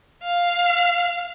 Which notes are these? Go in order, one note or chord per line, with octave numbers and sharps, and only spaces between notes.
F5